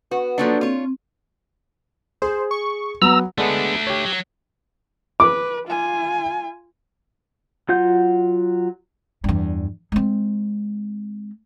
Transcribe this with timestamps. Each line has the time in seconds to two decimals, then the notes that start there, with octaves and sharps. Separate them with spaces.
0.11 B3 F#4
0.38 F3 F#3 A#3 D4 F#4 A4
0.61 C4 F4 C#5
2.22 G#4 C5
2.51 C#6
3.02 F#3 B3 A#5 E6
3.38 D3 G#3 A3 B3 D4
3.87 G4 C#5
4.04 F#3
5.20 B4 D6
5.68 F4 G#5
7.69 F#3 F4 F#5 G6
9.24 E2 G2
9.92 G#3 C4